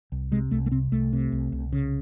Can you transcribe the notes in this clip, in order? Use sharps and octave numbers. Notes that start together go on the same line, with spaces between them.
C2
C3 G#3
C2 A3
A3
C3 C4
C2 A3
C3
C2
C2
C#3